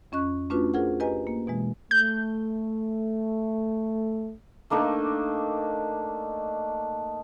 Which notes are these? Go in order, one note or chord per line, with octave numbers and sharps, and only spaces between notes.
F2 C#4 D#5 C#6 F#6
A3 C#4 D4 F4 F#4 B4
F4 G#4 A#4 C5 F#5
G4 B4 D#5 G#5 A#5
A#3
B2 E3 G#3
A3 G6
A3 A#3 D4 D#4